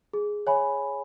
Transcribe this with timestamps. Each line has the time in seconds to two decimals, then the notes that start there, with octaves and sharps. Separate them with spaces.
0.13 G#4
0.47 C#5 E5 G#5 B5